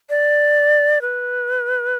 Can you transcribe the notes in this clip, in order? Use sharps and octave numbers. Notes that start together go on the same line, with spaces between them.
D5
B4